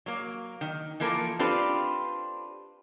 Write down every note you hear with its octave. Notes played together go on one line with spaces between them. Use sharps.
F#3 A#3
D#3
E3 F3 A#3 A4 A#4
C4 D4 F4 G4 A4 B4